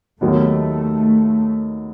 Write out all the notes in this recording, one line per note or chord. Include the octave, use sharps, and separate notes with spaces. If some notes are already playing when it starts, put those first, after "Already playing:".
D#2 D#3 F#3 A3 B3 D#4